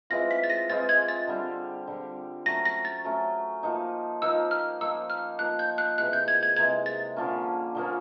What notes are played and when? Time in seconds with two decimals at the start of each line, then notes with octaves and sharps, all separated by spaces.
0.10 E3 G#3 C4 F4 A#6
0.31 B6
0.44 A6
0.50 A#6
0.70 E3 G#3 C4 F4 A6
0.89 G#6
1.08 A6
1.27 D3 G3 C4
1.87 D3 G3 C4
2.46 F#3 A3 C#4 A#6
2.65 A#6
2.85 A6
3.04 F#3 A3 C#4
3.63 F3 A#3 D#4
4.22 F3 A#3 D#4 E6
4.51 F6
4.81 F3 A#3 D#4 E6
5.10 F6
5.39 F3 A#3 D#4 F#6
5.59 G6
5.78 F#6
5.98 C3 E3 G#3 F#6
6.13 G6
6.28 G#6
6.43 G#6
6.57 C3 E3 G#3 G#6
6.86 A6
7.16 D3 F3 A#3 C#4
7.75 D3 F3 A#3 C#4